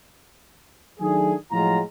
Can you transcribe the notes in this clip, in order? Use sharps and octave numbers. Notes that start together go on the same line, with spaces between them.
D#3 F#3 A3 D4 G#4
A2 F3 F#3 G#3 F4 A#5